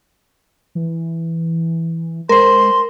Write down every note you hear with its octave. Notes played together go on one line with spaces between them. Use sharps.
E3
G#3 A#4 C5 C6